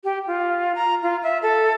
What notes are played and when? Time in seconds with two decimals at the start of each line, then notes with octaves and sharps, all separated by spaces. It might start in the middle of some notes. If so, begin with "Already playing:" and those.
0.04 G4
0.27 F4
0.75 A#5
1.03 F4
1.23 E5
1.42 A4